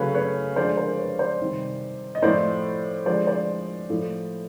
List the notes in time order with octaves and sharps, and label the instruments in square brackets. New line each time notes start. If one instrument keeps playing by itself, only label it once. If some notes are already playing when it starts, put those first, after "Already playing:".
Already playing: [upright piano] C#3 F#3 A3 B4 C#5
B4 C#5
D3 F3 G#3 C5 D5
A#4 C5
B4 C#5
C5 D5
C3 D#3 G3
D#5
A2 F3 A3 C5 D5
D3 F3 G#3 C5 D5
C5 D5
A2 F3 A3